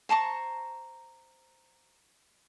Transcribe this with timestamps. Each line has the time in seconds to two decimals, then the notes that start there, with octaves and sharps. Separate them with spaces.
0.09 C5 A5 A#5 C#6